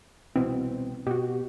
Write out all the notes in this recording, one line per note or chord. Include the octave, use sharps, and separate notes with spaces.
C2 B2 E3 C4
B2 F#4 G4